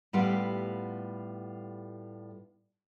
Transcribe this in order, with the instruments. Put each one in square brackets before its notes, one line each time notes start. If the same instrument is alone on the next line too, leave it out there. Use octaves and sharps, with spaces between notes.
[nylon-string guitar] A2 G3 B3 F4 G4 F#5